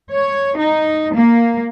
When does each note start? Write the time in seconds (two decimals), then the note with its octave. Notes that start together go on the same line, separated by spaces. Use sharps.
0.11 C#5
0.56 D#4
1.13 A#3